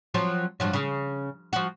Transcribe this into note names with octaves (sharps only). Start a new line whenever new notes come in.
F3 F#3 C4
G2 F3 F#3
C#3
F3 F#4